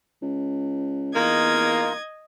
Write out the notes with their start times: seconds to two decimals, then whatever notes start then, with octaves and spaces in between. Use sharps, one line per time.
0.22 C#2
1.15 E2 A#3 D#4 F4 A#4 D#5 G#6